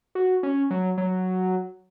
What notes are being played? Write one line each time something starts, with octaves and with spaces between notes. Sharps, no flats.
F#4
C#4
F#3
F#3